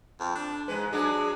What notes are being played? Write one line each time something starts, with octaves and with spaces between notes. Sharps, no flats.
F2
D4
G#2 G#3 B4
F#3 G#3 D4 G#4